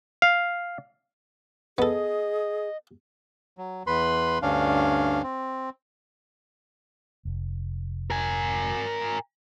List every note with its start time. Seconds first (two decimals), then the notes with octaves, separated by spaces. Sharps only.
0.22 F5
1.78 B3 G#4 A4 D#5
3.58 F#3
3.87 E2 B4 B5 C6
4.42 D2 G2 C#4 D4 F5
5.23 C4
7.25 F1
8.10 A#4 G#5